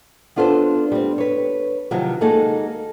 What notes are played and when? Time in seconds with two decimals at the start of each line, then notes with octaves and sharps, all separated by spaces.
0.36 B3 D4 F4 A4 B4 C5
0.92 G3 C4
1.18 B4 C#5
1.91 C3 D#3 F3 F#3
2.21 G#3 A#3 D#4 F#4 G#4 A4